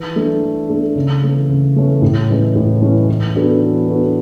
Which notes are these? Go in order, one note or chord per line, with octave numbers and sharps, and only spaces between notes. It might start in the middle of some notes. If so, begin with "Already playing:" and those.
Already playing: E3
A3 D4 A4
E3
A3 D4 A4
C#3
E3 A3 C#4
C#3
E3 A3 C#4
A2
E3 G#3 C#4 E4
A2
E3 G#3 C#4 E4
E3
B3 D4 F#4 A4
E3
B3 D4 F#4 A4